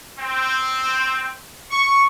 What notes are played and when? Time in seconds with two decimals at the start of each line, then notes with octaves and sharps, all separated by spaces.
0.18 C4
1.71 C#6